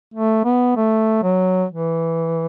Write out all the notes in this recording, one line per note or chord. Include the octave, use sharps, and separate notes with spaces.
A3
B3
A3
F#3
E3